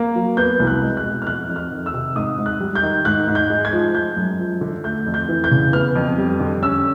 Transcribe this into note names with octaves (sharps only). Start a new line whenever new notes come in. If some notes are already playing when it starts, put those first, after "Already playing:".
Already playing: A#3
F#3
B3 G6
C2
F#6
G#3
F#6
B2
F6
F2 F#6
F2
F6
D#3
E6
C3
G#2 D#6
G#2
F#6
G3
G6
D#3
G#2 F#6
G#2
G6
G#3
G#6
F3
G#3 G6
F#2
F3
D3
A3 G6
F2
G6
E3
G6
C#3
B3 F6
F2
G3
D3
C#4 E6